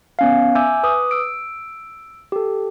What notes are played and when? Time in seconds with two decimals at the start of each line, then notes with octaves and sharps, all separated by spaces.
0.19 B3 C#4 F5
0.55 E5 G#5 D6 E6 G6
0.83 B4 D6 D#6
1.11 E6 D7
2.32 G4 A4